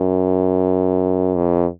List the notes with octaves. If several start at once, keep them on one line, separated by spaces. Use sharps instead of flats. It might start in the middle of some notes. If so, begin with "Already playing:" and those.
Already playing: F#2
F2